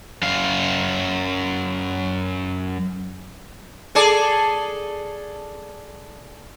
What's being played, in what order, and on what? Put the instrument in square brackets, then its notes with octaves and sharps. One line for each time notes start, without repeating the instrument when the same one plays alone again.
[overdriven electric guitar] F#2 F5
[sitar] G#4 A4 D5